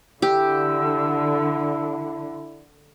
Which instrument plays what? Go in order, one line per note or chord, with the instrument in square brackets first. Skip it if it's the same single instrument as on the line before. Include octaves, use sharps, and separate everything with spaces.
[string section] D3 [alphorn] E4 [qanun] G4 [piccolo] E6